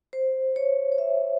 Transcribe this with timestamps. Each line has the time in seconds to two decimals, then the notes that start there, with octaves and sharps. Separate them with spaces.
0.13 C5
0.56 C#5
0.92 C#5
0.98 E5